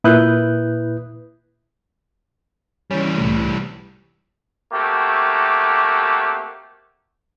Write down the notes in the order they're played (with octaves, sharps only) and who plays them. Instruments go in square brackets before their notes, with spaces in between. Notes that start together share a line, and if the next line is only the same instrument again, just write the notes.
[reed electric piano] A#2 E4 B4 D#6 F#6 G6
[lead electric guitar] E3 G3 [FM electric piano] C#4
[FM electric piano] C2 A2
[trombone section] A3 A#3 C4 F#4 G4